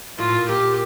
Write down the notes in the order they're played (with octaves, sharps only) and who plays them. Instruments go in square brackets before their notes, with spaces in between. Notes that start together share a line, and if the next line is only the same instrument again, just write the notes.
[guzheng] A2 [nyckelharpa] F4
[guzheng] A#2
[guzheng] A#2 [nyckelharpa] G4